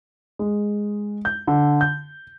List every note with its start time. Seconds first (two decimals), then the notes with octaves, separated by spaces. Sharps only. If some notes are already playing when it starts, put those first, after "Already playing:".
0.39 G#3
1.25 G6
1.47 D3
1.81 G6